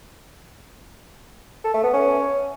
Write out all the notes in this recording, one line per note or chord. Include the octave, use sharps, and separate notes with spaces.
A4
A3
B3
C#4